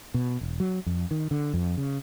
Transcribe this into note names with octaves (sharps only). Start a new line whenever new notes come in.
B2
E1
F#3
F2
D#3
D3
F2
C#3